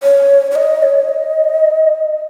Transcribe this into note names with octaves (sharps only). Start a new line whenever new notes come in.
C#5
C#5
D#5
C#5
D#5